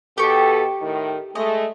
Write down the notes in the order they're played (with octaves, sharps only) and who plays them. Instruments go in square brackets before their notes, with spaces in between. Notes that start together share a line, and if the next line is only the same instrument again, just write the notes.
[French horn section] B2 A4 [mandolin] G4 C#6
[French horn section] A2 D#3
[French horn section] G#3 A3 [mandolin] D#5